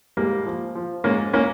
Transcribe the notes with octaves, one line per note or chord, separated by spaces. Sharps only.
G#2 G3 A#3
F3
F3
G#2 A#3 C#4
A#3 C#4